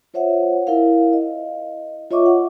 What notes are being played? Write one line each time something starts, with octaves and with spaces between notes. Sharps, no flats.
F4 C5 C#5 E5 F#5
E4 A#4 F5
D#5
F4 C#5 D#5 E5 C#6 D6
F#5